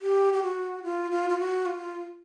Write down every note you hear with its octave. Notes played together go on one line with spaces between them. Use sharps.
G4
G4
F#4
F4
F4
F4
F#4
F4